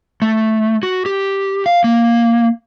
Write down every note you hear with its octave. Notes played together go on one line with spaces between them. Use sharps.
A3
F#4
G4
F5
A#3